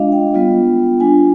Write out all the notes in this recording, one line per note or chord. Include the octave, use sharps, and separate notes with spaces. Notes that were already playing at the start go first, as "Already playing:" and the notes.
Already playing: G#3 D4 F4 D#5 F5
G5
G3 B3 F4
G3 D4 F4 G#5